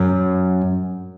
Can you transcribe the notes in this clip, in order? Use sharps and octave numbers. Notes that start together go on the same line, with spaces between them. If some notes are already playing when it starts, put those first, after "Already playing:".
Already playing: F#2